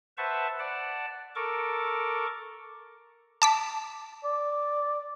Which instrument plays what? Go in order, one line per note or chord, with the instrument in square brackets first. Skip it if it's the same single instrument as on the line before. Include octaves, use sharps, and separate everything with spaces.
[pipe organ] B4 C5 E5 F#5 A5 C#6
D5 F#5 A5
A4 A#4 C#6 D6
[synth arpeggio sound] A5 D6 B6
[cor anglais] D5